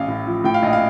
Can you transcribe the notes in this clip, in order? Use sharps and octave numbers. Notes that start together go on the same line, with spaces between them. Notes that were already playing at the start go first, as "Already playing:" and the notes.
Already playing: A1 F5
A2
F3
A2 G5
F5
A#1 D#5
F5